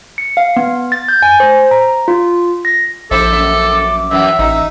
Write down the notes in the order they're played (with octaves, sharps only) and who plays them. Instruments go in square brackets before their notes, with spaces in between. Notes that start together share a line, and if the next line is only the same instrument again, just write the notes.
[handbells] C#7
F5
B3
A6
G6
G#5
C5
A#5
F4
A#6
[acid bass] A#1 [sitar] E4 C5 E5 [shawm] A4 [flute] D6
[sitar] F#2 E5
[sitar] F#2 E3 [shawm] E5
[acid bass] A1 [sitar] D#4